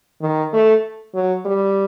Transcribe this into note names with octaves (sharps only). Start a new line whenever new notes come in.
D#3
A3
F#3
G3